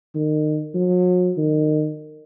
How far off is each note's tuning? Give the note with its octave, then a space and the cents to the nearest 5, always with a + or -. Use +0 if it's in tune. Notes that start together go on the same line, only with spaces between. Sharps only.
D#3 -30
F#3 -40
D#3 -30